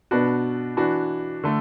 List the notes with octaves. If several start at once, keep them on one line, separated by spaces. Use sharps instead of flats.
B2 B3 D4 F#4
E3 D4 F#4
D3 A3